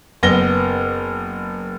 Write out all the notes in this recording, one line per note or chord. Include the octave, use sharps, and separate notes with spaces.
F#1 B3 A#6 G7